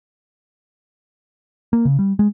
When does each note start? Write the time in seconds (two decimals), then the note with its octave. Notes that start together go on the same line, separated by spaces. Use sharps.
1.73 A#3
1.85 C#3
1.99 G3
2.19 G#3